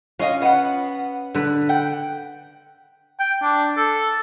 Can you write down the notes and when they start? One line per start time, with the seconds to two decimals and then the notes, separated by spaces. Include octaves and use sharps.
0.19 C#4 F4 D#5 F5
0.42 B3 F#5
1.35 D3 B4
1.69 F#5 G5
3.20 G5
3.43 D4
3.77 A4